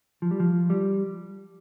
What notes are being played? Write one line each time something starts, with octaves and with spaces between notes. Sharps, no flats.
F3
G3
F3
G3